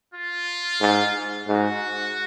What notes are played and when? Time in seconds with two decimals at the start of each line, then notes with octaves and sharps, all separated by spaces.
0.14 F4
0.81 G#2
1.47 G#2 F#4